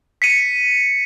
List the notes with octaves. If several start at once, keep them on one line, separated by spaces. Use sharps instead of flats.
B6 C#7 D#7